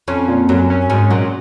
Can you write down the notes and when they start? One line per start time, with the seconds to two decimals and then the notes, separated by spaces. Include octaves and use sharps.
0.08 F2 C#4
0.28 A#2
0.49 F#2 F#3
0.70 C#4
0.90 G#2 C#4
1.10 A#2 F#3